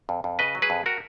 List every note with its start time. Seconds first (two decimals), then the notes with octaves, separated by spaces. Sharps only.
0.09 F2
0.24 F2
0.39 C#3 B4 D#5
0.55 F#3
0.62 G#4 B4
0.70 F2
0.86 F#4 A#4